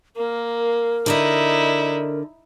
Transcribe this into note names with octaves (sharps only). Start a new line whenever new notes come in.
A#3 A#4
D3 D#4 E4 D5 D#5